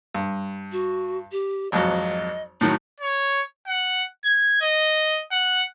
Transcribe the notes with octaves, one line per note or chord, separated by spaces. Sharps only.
G2
F#4
G4
G#1 F2 F#3 D#5
A2 D#3 F#3 E4
C#5
F#5
G#6
D#5
F#5